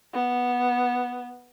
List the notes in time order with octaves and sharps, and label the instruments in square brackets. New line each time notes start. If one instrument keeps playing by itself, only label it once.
[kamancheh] B3